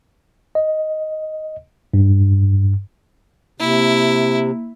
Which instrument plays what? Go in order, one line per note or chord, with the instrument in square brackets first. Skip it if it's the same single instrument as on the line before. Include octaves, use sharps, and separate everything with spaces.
[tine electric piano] D#5
G2
[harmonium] C3 [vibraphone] A#3 [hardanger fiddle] E4